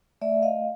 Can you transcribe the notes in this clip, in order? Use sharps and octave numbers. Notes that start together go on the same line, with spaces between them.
A3 D5 E5
D#5 F5